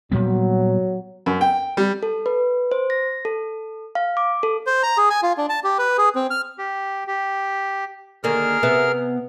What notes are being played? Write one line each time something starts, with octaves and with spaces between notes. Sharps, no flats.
A#2 F#3 G3 B3
F#2
G5
G3
A4
B4
C5
A#6
A4
F5
D6
A4
C5
A#5
G#4
G#5
F4
D4
A5
G4
B4
G#4
C4
F6
G4
G4
D3 D#3 A#3 G#4 A#4 F6
C3 B3 E5